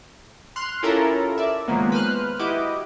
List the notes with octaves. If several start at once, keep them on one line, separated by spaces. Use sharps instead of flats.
C6 F6 F#6
C#4 E4 F4 G4 A4 A#4
D5 E5
D#3 F3 F#3 G#3 A#3 B3
B4 C5 F6 F#6
E4 F#4 G4 D#5 D6